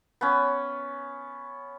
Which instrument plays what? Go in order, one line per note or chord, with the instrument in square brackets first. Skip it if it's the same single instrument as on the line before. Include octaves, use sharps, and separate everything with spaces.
[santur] B3 C#4